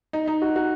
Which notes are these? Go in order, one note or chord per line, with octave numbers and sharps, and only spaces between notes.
D#4
D#4
F#4
F#4